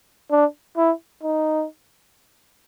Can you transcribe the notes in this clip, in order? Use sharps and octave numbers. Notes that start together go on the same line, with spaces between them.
D4
E4
D#4